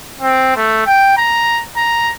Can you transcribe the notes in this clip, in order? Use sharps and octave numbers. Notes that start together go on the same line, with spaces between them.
C4
A3
G5
A#5
A#5